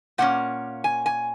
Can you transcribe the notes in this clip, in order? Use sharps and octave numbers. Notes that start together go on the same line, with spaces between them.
A#2 A#3 C#4 F#5
G#5
G#5